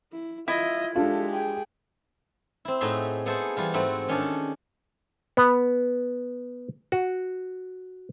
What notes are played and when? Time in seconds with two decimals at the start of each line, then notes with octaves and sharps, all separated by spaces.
0.12 E4
0.48 E4 F4 D#5 E5
0.95 G#3 D4 F4 G4 A4
1.30 G#4 G5
2.65 C4 E4
2.81 A2 D#4 F#4 G#4 E5 C6
3.26 B3 E4 G#4 A4 C5
3.57 E3 G3 F4
3.74 G#2 A3 C4 E4 F#4
4.08 D#3 C#4 D4 G#4 A4
5.37 B3
6.92 F#4